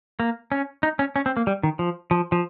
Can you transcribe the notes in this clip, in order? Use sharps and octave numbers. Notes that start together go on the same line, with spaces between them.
A#3
C#4
D#4
C#4
C#4
C4
A#3
G3
D#3
F3
F3
F3